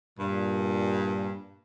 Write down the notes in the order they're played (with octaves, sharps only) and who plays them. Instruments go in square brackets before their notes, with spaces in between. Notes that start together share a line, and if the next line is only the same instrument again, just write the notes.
[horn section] G2 A#2